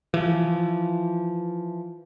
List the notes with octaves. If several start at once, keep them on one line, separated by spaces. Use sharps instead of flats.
E3 F3